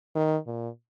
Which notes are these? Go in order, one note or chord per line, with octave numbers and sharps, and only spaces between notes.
D#3
A#2